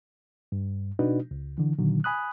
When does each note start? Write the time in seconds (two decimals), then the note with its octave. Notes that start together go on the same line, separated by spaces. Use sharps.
0.52 G2
0.99 B2 D4 D#4 F#4 B4
1.31 C#2
1.58 D3 E3
1.79 A#2 D3 D#3 F#3
2.04 G#5 B5 D#6 F#6